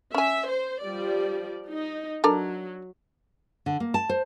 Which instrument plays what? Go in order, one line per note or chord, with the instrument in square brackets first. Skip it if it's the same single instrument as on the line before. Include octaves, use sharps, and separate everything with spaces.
[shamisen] C#4 G#5 [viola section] E5
[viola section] C5
F3 G3 D5
D#4
[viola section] F#3 [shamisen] D4 A4 A#4
[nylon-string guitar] D3
A#3
A5
C5